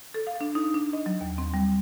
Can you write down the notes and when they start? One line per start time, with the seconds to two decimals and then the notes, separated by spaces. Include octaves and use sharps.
0.14 A4
0.27 F5
0.41 D4
0.55 D#4
0.74 D4
0.93 D#5
1.06 F#3
1.21 D#2
1.38 C4
1.54 G3